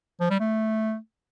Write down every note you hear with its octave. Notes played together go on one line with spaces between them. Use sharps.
F3
G3
A3